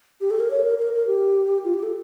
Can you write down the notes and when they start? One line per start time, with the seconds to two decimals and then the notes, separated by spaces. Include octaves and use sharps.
0.21 G4
0.30 A4
0.40 A#4
0.51 C#5
0.64 A#4
0.78 A#4
0.93 A#4
1.07 G4
1.64 F4
1.74 G4
1.83 A4